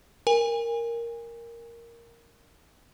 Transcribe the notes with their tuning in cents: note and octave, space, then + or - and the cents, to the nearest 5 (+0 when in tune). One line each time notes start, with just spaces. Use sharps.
A#4 +0 G#5 -30